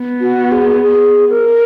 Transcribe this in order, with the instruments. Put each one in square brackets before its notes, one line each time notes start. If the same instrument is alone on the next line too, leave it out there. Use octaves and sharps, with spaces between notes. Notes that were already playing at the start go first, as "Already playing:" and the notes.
Already playing: [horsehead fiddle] B3
[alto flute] F#4
G#4
G#4
A#4